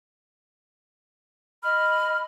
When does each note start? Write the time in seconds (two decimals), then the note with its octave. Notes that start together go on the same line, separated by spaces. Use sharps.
1.64 D#5 B5 F6